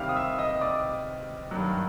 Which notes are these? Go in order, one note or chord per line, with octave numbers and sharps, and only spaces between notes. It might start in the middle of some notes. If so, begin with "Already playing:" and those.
Already playing: C3 D#3 G3 E5 F5 F6
D#6
E5 E6
D#5 D#6
D5 D6
G2 D#3 F#3